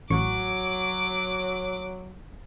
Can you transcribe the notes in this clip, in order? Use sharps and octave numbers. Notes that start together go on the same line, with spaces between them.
A1 F#3 C#6 D6